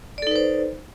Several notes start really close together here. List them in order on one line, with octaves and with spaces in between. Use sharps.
D5 A4 D#4 B4 C5